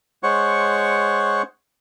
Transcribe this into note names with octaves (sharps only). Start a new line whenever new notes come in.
G#3 C5 C#5 F#5 C#6